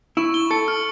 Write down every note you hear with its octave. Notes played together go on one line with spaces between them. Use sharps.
E4 C#6
G7
A4 C#7
F6